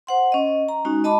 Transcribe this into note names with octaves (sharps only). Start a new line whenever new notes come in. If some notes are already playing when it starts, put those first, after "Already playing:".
C5 F#5 C6
C#4 D#5
A#5
G#3 C#4 D#4 F#4
D#5 A5 B5 D6